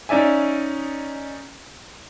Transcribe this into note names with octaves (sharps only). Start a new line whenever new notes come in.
C#4 D#4 D5 E5 G#5